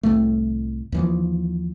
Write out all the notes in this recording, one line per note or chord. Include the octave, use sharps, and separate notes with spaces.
C2 F#2 A2 A3
D#2 E3 F3